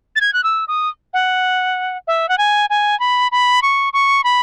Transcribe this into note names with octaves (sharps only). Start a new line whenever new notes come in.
A6
G#6
F#6
E6
D#6
F#5
E5
F#5
G#5
G#5
B5
B5
C#6
C#6
B5